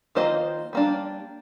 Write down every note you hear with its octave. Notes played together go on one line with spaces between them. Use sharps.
D#3 A#3 F4 C5 D#5
G3 A#3 D4